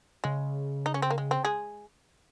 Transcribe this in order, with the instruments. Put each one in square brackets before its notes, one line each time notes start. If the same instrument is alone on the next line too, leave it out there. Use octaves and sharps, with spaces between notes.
[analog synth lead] C#3 [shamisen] G#3
[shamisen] D#4
C#4
C4
A#3
G#3
C4
G#3 G#4